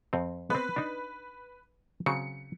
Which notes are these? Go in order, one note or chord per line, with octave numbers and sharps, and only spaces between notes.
F2 C4
B3 C4 B4
D4 D#4
C#3 F#3 C4 C#7